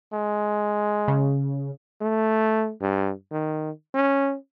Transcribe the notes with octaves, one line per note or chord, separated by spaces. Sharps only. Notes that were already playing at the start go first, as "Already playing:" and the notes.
G#3
C#3
A3
G2
D#3
C#4